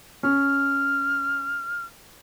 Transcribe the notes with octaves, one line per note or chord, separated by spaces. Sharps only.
C#4 F6